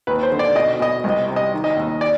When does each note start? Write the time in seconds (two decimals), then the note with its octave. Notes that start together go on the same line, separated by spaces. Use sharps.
0.07 D#2 B4
0.23 C5
0.31 D3
0.39 D5
0.56 B2 D#5
0.80 B2 D#5
1.04 C2
1.10 D#5
1.28 C3
1.36 D#5
1.53 D#3
1.64 D#5
1.77 D#2
2.01 D5